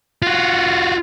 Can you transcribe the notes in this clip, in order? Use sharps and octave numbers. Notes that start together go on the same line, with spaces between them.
F4 F#4